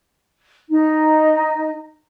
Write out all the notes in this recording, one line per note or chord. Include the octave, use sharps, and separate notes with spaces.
D#4